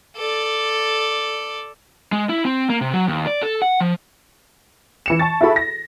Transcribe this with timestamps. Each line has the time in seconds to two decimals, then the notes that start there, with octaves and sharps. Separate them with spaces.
0.16 A4 D5
2.12 G#3
2.29 E4
2.45 C4
2.70 A#3
2.81 C3
2.93 F#3
3.07 D#2
3.27 D5
3.42 A4
3.62 F#5
3.81 F3
5.06 E3 C#7 E7
5.19 A5 C#6 A6
5.41 E4 F#4 G#4 A4 B5 C#6
5.56 A#6